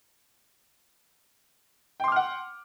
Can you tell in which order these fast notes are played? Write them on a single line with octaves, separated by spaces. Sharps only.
G5 C6 D6 F6 F#5